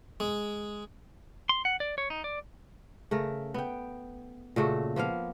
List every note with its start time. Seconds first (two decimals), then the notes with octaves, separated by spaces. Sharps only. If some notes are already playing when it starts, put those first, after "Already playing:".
0.20 G#3
1.49 C6
1.65 F#5
1.80 D5
1.98 C#5
2.10 D#4
2.24 D5
3.11 C#3 A3 A#4
3.54 B3 G5
4.56 A#2 C#3 A3 F#4
4.96 F3 A#3 B3 F5